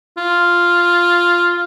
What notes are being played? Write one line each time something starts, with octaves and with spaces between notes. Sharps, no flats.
F4